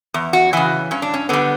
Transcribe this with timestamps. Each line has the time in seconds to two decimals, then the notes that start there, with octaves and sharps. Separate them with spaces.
0.14 E2
0.33 F#4
0.53 C#3 E3 F#4
0.91 G2 C#4
1.02 D4
1.14 C#4
1.29 D3 G3 B3